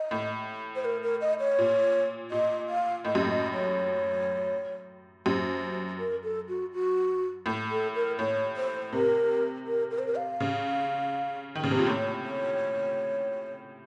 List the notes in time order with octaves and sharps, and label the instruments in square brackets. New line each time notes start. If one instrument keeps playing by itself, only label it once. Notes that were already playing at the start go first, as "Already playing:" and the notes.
Already playing: [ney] D#5
[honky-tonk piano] A2
[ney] C5
A#4
A#4
D#5
C#5
[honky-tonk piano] A#2
[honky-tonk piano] A#2 [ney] D#5
[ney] F5
[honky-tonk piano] A2 [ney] D#5
[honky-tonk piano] F#2
A2
[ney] D#5
C#5
[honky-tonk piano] F#2 [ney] C5
[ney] A#4
A4
F#4
F#4
[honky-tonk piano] A2
[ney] A4
A#4
[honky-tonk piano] A2 [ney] C#5
[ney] C5
[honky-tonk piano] C3 [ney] A#4
[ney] A#4
A#4
C5
A#4
F5
[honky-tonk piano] C#3
D#3
C#3
C3
A#2
[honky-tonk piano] A2 [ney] C#5
[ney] C#5